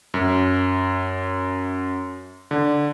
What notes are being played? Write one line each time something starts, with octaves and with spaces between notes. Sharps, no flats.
F#2
D3